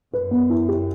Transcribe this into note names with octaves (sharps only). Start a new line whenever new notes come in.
F#2 B4
B3
E4
G4